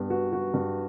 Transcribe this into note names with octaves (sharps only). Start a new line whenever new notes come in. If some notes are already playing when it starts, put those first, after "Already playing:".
Already playing: G2 B3
F#4
F#4
G2